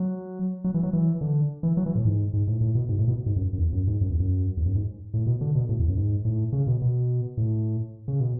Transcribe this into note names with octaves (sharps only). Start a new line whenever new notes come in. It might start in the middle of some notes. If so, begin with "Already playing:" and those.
Already playing: F#3
F#3
E3
F#3
E3
D3
E3
F#3
E3
A2
G#2
G#2
A2
A2
B2
G#2
A2
B2
G#2
F#2
F#2
E2
F#2
G#2
F#2
E2
F#2
E2
F#2
G#2
A2
B2
D3
B2
A2
E2
F#2
G#2
A2
C#3
B2
B2
A2
C#3
B2